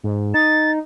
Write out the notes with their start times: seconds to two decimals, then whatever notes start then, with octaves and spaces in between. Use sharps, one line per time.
0.04 G#2
0.34 D#4 A6